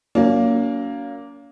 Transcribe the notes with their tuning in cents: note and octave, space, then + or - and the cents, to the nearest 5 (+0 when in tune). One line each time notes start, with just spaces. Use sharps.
F#3 +0 A#3 +0 C#4 +45